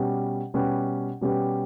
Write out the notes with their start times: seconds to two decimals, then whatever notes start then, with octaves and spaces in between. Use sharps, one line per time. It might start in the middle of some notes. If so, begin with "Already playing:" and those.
Already playing: B2 G3 C#4 G4 B4
0.54 B2 G3 C#4 G4 B4
1.21 B2 G3 C#4 G4 B4